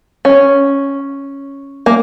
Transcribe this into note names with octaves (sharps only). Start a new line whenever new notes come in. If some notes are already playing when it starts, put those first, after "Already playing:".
C#4
A#3